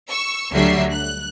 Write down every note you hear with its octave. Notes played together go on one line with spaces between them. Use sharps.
C#6 E6
D2 D3 F#3 G3 E5 C7
F#6